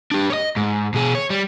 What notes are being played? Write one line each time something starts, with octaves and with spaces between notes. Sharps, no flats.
D4 G4
C#5 D#5
G#2
B2 G#4
C#5
G3